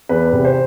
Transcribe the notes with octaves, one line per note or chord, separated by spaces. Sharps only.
E2 B4
C3
C5